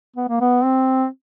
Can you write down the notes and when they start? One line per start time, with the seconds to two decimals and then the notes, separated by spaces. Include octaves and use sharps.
0.16 B3
0.29 A#3
0.41 B3
0.64 C4